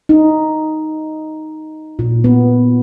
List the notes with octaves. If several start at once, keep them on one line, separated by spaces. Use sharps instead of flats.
D#4
A#2
B3